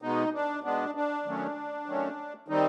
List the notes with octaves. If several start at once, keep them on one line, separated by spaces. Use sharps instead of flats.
B2 G#3 B3 D#4
D4
B2 G#3 B3 D4
D4
D#3 F#3 A3 C#4
D#3 F#3 A3 C#4
D#3 G3 C4 D#4